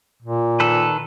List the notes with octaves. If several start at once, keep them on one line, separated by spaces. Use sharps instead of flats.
A#2
D#3 A4 B4